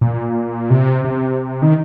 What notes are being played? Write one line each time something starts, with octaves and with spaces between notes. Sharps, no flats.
A#2
C3
C3
D#3